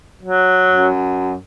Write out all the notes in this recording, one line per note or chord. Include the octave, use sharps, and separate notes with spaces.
F#3
F#2